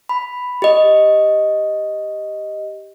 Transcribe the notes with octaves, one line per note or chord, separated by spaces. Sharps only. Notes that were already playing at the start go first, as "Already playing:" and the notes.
B5
G4 D#5